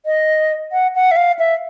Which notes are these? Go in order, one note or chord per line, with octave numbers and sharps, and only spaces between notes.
D#5
F#5
F#5
E5
F5
E5